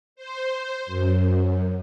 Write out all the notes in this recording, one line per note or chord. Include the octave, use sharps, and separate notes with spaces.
C5
F#2